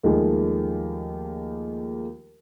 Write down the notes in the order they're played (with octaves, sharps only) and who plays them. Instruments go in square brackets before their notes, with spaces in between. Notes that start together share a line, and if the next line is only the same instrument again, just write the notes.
[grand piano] D#2 D#3 F3 G#3 A3